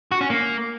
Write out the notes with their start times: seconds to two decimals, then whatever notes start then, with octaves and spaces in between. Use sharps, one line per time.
0.12 F#4
0.21 C#4
0.30 A#3